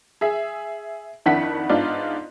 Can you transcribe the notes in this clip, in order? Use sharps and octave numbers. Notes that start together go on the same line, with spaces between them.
G#4 E5
F2 D#3 D4 E4 F#5 B6
G#2 B3 D4 D#4 F4 D5